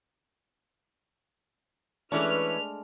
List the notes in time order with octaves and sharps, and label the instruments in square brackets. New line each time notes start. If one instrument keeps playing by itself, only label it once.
[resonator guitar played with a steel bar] E3 C#4 [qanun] G#3 A3 D4 [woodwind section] B4 [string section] F6